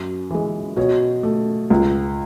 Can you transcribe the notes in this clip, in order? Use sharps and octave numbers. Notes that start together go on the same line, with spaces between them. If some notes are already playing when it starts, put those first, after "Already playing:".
Already playing: F#2 C#5
E3 G#3
B2 C#5
A3
C#2